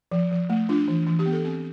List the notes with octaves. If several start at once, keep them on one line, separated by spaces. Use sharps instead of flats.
F3
F3
A3
D4 F4
E3
E3
G4
B3
A4
C4